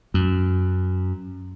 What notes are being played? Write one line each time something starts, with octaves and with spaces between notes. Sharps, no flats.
F#2